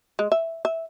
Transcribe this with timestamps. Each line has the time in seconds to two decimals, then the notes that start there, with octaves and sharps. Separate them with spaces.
0.19 G#3
0.32 E5
0.65 E5